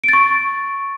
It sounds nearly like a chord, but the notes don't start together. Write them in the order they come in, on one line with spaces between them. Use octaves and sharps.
D7 A6 C#6